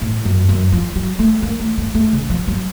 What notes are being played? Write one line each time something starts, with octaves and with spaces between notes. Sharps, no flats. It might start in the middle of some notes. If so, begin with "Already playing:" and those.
A2
F#2
F#2
F3
F#3
A3
A#3
A3
A3
A3
C#3
F3
F#3